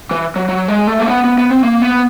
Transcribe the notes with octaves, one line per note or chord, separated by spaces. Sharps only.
E3
F#3
F#3
G#3
A3
A#3
B3
B3
B3
C4
A#3
B3